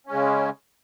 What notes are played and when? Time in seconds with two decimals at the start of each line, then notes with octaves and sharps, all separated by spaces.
0.07 C#4
0.10 G#3
0.13 C#3